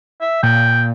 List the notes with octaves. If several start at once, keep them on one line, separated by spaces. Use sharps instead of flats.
E5
A#2 G5